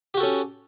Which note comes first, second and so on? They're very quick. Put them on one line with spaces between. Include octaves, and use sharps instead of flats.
G4 F#4 A4 C#4